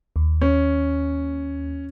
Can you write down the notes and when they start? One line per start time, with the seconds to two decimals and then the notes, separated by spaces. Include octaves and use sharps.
0.16 D#2
0.41 C#4